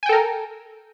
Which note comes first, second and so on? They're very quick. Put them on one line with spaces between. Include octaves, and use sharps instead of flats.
G#5 G5 A4 A#4